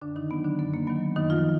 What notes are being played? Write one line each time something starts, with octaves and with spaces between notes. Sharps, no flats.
F#2 D3 D4
D#3 D#4
D#3 F#3 B3
D3 D4
F#2 B3
A#3
D#3 F#3 B3
F#2 D#3 D#4
F3 F4